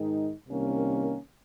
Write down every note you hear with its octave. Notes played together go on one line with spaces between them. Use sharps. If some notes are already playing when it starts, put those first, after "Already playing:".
Already playing: G#2 D#3 G#3 D#4
C2 C3 D#3 A#3 C#4